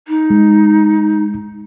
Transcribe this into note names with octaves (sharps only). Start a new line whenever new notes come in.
D#4
G#3